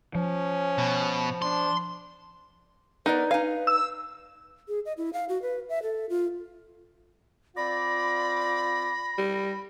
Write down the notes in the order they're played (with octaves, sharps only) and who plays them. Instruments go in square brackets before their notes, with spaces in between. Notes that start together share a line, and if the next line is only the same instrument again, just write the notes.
[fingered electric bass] F3 [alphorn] C#4
[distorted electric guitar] B2
[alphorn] D4 [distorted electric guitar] C6
[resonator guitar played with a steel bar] B3 A#4 D5 [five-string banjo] D#4 [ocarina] B4
[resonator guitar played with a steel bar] D#4 G#5 [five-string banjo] F5
[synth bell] E6
[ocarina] G#4
D#5
E4
F5
F#4
B4
E5
A4
F4
[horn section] C4 F4 D5 [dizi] B5 [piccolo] A#6
[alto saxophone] G3